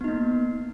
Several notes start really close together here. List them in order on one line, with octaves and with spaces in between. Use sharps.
B3 D#4 A#3